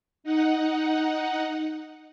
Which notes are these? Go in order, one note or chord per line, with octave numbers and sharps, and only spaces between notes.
D#4 F#5